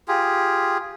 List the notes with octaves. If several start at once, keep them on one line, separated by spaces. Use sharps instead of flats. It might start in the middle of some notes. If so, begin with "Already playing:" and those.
F4 G4 G#4